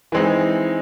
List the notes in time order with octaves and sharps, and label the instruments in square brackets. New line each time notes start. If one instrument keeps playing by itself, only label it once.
[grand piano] E3 G#3 C4 D#4